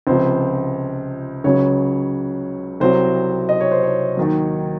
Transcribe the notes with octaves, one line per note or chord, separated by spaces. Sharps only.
C#2 C3 F3 C5
C#2 C#3 F#3 C#5
C2 C3 F#3 C5
D#5
C#5
C5
C#5
D#2 D#3 F#3